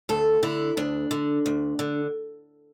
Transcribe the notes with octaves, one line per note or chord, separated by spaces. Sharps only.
D2 A4
D3 E4
D2 D4
D3
D2
D3